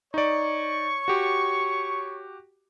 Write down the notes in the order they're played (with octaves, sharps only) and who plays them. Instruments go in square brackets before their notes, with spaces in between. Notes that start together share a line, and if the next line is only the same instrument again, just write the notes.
[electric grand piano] D#4 D5 [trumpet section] C#5 C#6
[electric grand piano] F#4 G4